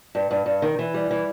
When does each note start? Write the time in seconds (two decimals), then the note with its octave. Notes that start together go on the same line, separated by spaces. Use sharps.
0.15 G2
0.31 G2
0.46 G2
0.62 D#3
0.79 E3
0.94 G3
1.11 E3